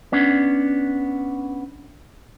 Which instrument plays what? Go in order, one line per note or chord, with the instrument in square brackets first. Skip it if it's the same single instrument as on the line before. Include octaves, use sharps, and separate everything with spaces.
[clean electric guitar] B3 C#4 D4